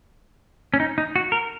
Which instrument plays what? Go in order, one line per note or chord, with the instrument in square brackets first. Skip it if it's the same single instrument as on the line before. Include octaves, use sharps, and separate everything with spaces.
[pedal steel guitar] C#4
D#4
D#4
F#4
A#4